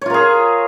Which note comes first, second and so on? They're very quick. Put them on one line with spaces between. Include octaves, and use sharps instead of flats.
C#5 F4 A#4 G#4